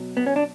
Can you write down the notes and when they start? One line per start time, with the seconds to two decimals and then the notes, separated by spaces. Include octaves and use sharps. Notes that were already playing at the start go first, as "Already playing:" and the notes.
Already playing: B2 F#3
0.17 B3
0.26 C#4
0.36 D4